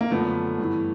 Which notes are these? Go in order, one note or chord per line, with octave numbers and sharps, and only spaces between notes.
A#3
F#2 D3 F3 A3 B3
G2 E3